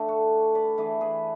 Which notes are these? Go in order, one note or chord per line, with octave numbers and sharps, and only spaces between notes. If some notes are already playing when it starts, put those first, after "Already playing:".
Already playing: D3 A3 D4
F#4 A4
B4 D5
E3 A3 D4 G#4 B4
G#4 B4